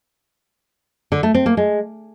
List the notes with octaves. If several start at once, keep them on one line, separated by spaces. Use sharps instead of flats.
D3
A3
C4
A#3
G#3